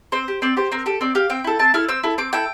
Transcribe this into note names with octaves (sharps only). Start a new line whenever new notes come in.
C4 C5
G4
C4 D5
G4 C5
C4 A#4
G4 A4
C4 D5
G4 F5
C4 G5
E4 A4
C4 A5
E4 A4 F6
C4 E6
E4 A4
C4 D6
E4 A4 G5